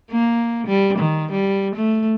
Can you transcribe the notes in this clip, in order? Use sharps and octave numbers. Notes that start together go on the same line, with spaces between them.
A#3
G3
D#3
G3
A3